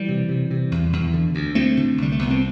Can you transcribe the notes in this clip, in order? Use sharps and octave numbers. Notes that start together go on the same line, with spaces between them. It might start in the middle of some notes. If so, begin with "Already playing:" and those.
Already playing: E3 G3
C3
C3
C3
E2
E2
D3
D2
D2 A3 C4
D3
C2 G3
A3
C2 B3
C4